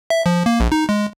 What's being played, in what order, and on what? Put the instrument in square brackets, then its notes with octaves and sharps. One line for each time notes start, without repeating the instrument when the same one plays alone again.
[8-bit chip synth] E5
F3
A#3
A#1
D#4
G#3